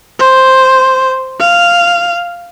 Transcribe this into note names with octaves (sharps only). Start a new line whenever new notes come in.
C5
F5